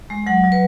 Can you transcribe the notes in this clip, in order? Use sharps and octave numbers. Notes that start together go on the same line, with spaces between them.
G#3
F#3 F#5
F#3
B4